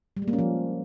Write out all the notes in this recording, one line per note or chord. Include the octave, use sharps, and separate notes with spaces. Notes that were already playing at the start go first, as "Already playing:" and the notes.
G3
G#3
A#3
C#4
F3